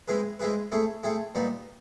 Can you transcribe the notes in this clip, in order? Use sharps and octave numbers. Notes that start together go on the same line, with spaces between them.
G#3 C4 E4 G#4 B4
G#3 C4 E4 G#4 B4
A3 C4 E4 G#4
A3 C4 E4 G#4
A#2 G3 B3 D#4